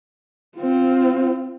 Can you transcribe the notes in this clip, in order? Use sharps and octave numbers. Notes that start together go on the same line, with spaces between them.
C4 F4